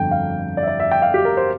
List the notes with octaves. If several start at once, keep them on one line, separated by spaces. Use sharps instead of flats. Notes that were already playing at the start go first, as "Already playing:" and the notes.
Already playing: G1 F2 D3 G5
F5
D5
E5
D5
E5
G5
F5
G4
A#4
C5